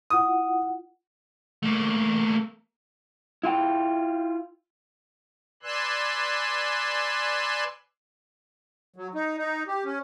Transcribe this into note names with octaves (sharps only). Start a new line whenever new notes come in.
E4 F4 F#5 D#6
A3 A#3
E4 F4 G5
B4 D5 G#5 C6 E6 F#6
F#3
D#4
D#4
G4
C#4